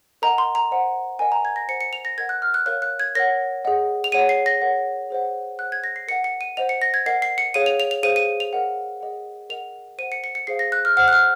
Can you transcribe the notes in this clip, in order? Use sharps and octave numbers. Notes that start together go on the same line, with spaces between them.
A#4 D#5 F#5 A#5
C6
A#5
C5 D#5 F#5
A#4 D#5 F#5 G#5
A#5
G#6
A#6
C5 F#5 C#7
C#7
F7
A#6
A#4 D#5 F#5 G#6
F#6
F6
F#6
A#4 C#5 F5 F#6
F#6
G#6
A#4 C#5 F#5 A#6
G#4 D#5 F#5
F7
G#4 C#5 F#5 D#7
C7
A#6
A#4 C#5 F#5
G#4 C5 D#5 F#5
C5 F#5 F#6
G#6
A#6
C7
A#4 D#5 F#5 C#7
C#7
D#7
C5 D#5 F#5 F7
C#7
A#6
G#6
A#4 D#5 F#5 C7
C7
C#7
G#4 C#5 F5 D#7
F7
F7
F7
G#4 C5 F5 D#7
D#7
F7
A#4 D#5 F#5
G#4 D#5 F#5
A#4 D#5 F#5 F7
C5 F#5 D#7
C#7
C#7
C#7
G#4 C5 F5 C7
A#6
F#6
F6
C5 F#5 F6
F#6
F6